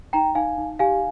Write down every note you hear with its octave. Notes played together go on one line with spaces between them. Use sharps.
D#4 G5 A#5
D#4 F5 G#5
D#4
G4 F5 G#5